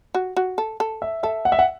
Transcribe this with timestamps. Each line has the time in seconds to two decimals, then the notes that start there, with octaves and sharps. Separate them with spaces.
0.14 F#4
0.36 F#4
0.58 A4
0.80 A4
1.02 E5
1.23 A4 E5
1.45 F#5
1.52 E5
1.59 F#5